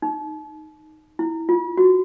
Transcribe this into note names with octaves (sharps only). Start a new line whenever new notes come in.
D#4
E4
F4
F#4